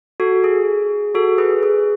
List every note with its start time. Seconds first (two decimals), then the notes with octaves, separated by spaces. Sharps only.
0.20 F#4 A4
0.44 G#4
1.15 F#4 A4
1.38 G#4 B4
1.63 G#4